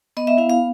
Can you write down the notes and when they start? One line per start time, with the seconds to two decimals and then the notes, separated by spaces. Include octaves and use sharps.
0.17 B3 D#5
0.27 E5
0.38 E4 F5
0.49 F5